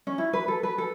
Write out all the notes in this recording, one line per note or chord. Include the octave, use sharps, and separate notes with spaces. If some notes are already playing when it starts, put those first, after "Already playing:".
C#4
E4
B4
A4
B4
A4